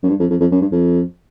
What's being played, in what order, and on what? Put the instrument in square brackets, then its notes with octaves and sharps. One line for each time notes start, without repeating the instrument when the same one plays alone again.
[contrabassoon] F#2
G2
F2
F2
F2
F#2
G2
F2